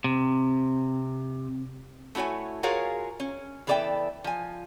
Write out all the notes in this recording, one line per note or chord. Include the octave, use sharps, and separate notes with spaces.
C3 C4
A3 E4 F#4 C#5 G#5
F4 F#4 G#4 A#4 C#5 F5
C#4
E3 B3 A4 D5 E5 G5
F3 G#5